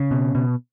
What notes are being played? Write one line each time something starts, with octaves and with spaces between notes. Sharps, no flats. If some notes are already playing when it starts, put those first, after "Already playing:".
Already playing: C#3
B2
B2